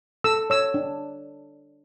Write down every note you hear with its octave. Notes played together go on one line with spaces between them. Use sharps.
A4 E6
C#5 E6
D4